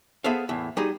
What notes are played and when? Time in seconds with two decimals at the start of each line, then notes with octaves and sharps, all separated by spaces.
0.24 B3 G#4 A4 C5 E5 F5
0.49 E2 A2
0.77 G3 D#4 F#4 G#4